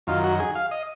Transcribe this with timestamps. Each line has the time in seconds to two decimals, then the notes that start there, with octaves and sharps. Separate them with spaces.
0.07 F#2 D#3 F4
0.24 F#4
0.40 G#4
0.55 F5
0.71 D#5